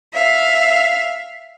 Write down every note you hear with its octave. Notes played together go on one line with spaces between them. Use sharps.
E5 F5